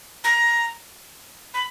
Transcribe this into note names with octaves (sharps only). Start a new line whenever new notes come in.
A#5
B5